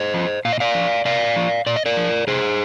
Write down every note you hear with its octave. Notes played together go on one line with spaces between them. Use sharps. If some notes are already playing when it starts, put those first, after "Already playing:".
Already playing: C5 D#5
F3
A#2 F5
D#5
D5 F5
F3
C3 D5 F5
F3
A#2 D5
D#5
A#4 D5
F3
C3 G#4 C5